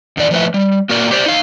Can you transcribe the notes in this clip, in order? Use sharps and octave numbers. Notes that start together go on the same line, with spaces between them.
E2 D#3 D5
F3 A3 B4 E5
G3
A#3 F#4 A#4 D5
G4 C5 D5
D#4 F5